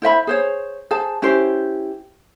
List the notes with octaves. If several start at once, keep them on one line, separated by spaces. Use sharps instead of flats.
E4 C5 E5 B5
G#4 C5 C#5
G#4 C5 A5
C#4 E4 G4 C5